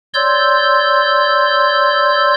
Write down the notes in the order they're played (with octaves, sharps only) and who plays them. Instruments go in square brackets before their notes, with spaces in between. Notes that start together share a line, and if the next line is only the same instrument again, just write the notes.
[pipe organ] C#5 D5 C6 E6 G6